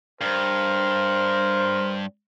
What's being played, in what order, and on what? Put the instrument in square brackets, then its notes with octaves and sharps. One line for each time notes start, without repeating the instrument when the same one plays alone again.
[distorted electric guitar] G2 [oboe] A#4 [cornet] C5